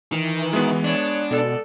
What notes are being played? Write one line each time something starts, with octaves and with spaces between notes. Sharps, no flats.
D#3 E3
G#3 B3 F#4
D4 C#5
B2 A4 D5